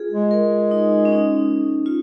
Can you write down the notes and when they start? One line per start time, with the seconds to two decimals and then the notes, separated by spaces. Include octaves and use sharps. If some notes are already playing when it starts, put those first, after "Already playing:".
Already playing: F4 G#4
0.11 G#3
0.31 A#4
0.71 D#4
1.05 C#4
1.12 D#4
1.86 F4